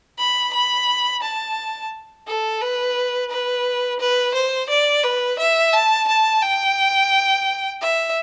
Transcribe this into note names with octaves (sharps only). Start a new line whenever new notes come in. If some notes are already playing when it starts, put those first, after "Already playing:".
B5
B5
A5
A4
B4
B4
B4
C5
D5
B4
E5
A5
A5
G5
E5